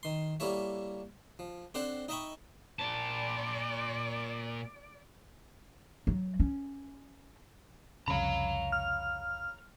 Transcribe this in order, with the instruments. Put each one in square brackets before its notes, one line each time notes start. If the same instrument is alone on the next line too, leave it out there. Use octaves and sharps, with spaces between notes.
[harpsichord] D#3 C6
G3 A#3 E4 A4 C#5 E5
F3
C4 D4 A4 C5 F#5 G5
D#4 D#5 E5 G5 B5 C#6
[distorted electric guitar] A#2 A5 [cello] D5
[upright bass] F#3
C#4
[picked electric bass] C2 F2 C#3 [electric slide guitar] C#5 A#5 [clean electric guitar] F5 B5
[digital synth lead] F6